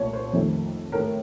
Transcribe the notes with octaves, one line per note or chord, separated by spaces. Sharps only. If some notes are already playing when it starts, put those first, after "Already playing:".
Already playing: C2 A#2 A3 C#5
C5
F2 D#3 A3
A2 A3 A#4